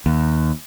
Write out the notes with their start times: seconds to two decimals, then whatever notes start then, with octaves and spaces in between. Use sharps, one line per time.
0.06 D#2